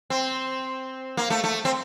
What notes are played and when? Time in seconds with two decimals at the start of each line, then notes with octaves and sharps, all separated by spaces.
0.10 C4
1.17 A#3
1.30 A3
1.44 A3
1.65 C4